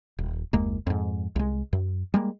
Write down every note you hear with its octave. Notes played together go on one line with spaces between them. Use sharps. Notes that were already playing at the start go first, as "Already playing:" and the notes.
D#1
F#1 D#2 G#3 A#3
F2 G#2
C2 G#3
F#2
G3 G#3 A#3